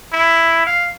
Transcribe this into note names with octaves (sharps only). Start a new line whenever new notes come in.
E4
F5